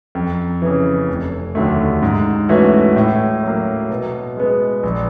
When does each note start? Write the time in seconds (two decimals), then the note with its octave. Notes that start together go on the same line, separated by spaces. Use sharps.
0.15 F2
0.62 C#3 E3
1.08 F1
1.55 D#2 D3 F#3 A3
2.02 G#2
2.49 E3 A3 C#4 F#4
2.96 A2
3.43 F#3 A#3
3.90 B2
4.37 G#3 B3
4.83 A#1